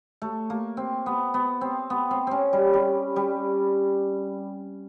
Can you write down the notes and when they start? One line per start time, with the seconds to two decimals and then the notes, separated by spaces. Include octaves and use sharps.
0.22 A3
0.50 A#3
0.77 C4
1.06 B3
1.34 B3
1.61 C4
1.90 B3
2.11 C4
2.27 C4 C#4
2.53 G3
2.73 G3
3.16 G3